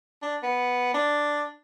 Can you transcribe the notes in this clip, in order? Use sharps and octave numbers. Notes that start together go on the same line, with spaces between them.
D4
B3
D4